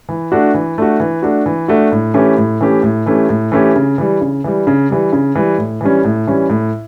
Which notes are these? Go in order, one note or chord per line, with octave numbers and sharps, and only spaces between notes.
E3
A3 D4 F#4
E3
A3 D4 F#4
E3
A3 D4 F#4
E3
A3 D4 F#4
A2
E3 A3 C#4 G4
A2
E3 A3 C#4 G4
A2
E3 A3 C#4 G4
A2
E3 A3 C#4 G4
C#3
E3 G3
C#3
E3 G3
C#3
E3 G3
C#3
E3 G3
A2
E3 G3 C#4
A2
E3 G3 C#4
A2